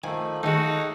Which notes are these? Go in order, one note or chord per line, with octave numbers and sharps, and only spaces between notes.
D#3 F3 A3 G#5
D#3 G#3 A3 D#4 F#4